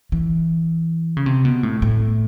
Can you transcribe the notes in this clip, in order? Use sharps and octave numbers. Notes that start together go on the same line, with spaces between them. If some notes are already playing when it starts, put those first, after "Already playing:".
E3
C#3
C3
B2
A2
A2